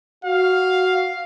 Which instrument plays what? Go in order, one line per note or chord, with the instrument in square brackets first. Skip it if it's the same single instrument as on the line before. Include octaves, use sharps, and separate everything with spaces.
[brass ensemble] F#4 [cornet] F5